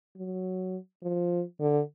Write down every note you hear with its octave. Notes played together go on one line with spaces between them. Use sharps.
F#3
F3
D3